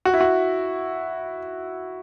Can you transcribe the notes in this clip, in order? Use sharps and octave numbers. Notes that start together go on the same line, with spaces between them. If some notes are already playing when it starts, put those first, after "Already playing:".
F#4
E4
F#4